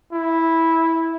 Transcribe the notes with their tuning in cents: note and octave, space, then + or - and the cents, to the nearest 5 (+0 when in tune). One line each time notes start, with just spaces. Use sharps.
E4 -10